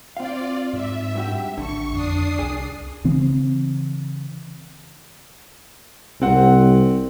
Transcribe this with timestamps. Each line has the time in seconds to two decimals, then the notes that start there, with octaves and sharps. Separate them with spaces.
0.17 C4 F4 D5 F5
0.73 G#2 E5
1.15 G2 F#4 G4
1.58 A1 D3 C#6
1.93 F2 D4 D#6 C7
2.39 C2 G#4
3.04 C#3 E3 C4
6.22 C2 C4 F#5